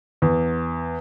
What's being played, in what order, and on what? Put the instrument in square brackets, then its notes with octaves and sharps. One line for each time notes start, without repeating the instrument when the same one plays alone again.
[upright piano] E2